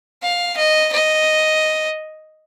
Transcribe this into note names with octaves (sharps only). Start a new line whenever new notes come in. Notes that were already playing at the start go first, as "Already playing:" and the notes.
F5
D#5
D#5